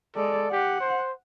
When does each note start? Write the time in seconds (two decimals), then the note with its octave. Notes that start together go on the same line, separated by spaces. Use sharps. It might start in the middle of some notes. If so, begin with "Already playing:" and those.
0.16 G#3 A4 D5
0.52 G4 F#5
0.81 C5